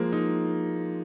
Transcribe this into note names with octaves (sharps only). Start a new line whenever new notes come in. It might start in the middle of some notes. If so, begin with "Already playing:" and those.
Already playing: F3 G#3 A#3
D#4